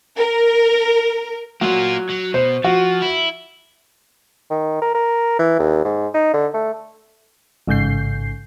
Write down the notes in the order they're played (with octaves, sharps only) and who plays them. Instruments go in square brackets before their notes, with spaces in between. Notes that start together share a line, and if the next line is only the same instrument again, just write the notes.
[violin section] A#4
[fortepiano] F#3 [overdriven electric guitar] A#3 F4
[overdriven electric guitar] F#3
[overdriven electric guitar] B2 [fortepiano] C5
[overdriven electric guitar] F3 [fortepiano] F#4
[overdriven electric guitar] E4
[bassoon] D#3
A#4
A#4
E3
D#2
G#2
D#4
D3
A3
[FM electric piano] A1 G#2 C#3 G6 C7